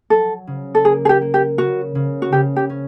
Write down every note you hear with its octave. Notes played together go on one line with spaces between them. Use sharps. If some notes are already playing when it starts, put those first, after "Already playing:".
F#3 A4
C#3
A4
A#3 G#4
G#4
G4
A#3
G4
C#3 F#4
C#3
F#4
C#3 G4
G4
C#4